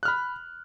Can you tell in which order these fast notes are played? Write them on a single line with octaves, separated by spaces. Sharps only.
F#6 F6 B5